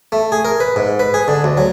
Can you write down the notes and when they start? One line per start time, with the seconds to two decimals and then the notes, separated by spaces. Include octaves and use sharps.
0.12 A3
0.32 G#4
0.45 A#4
0.60 B4
0.76 G#2
0.99 B4
1.14 G#4
1.28 D3
1.44 D2
1.57 F#3